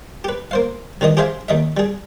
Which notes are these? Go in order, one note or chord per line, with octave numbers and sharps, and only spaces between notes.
G4 B4
A#3 C5 F5
C2 D#3 E3 D#5 D#6
G4 G#4 C5 E5 F5 G#5
D#2 D#5 E5
G3 G#4